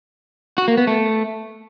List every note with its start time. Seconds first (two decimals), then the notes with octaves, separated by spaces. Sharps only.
0.58 F#4
0.68 A#3
0.78 B3
0.87 A3